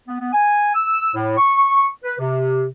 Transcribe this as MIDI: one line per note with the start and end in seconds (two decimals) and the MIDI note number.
0.08 0.15 59
0.20 0.30 59
0.33 0.72 80
0.75 1.11 88
1.14 1.37 45
1.37 1.87 85
2.04 2.15 71
2.19 2.66 48